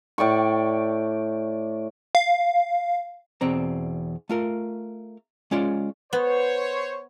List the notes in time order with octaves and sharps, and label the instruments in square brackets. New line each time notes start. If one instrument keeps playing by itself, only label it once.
[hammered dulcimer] A2 D5 G5 C#6
[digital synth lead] F5
[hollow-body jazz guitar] E2 B2 C4 D5 A#5
A3 F4 A#4
G#3 C#4 F4 D5
[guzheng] B3 [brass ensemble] C5 C#5